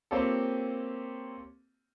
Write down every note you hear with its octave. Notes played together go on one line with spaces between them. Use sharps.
A#3 C4 C#4 F4 G4 A4